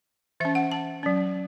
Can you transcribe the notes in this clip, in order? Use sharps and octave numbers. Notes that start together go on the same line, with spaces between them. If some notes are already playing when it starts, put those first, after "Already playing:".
E3 C#4 E5
F#5
A5
F#3 C#4